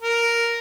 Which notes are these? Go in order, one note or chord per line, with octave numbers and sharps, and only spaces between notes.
A#4